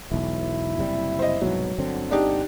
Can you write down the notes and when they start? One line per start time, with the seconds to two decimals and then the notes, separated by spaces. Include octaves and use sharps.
0.11 E1 B1 E4
0.78 F#1 C3 G3
1.19 C5 D#5
1.42 C2 G#2 B2 F#3
1.78 G1 D3 C4
2.11 D4 D#4 G4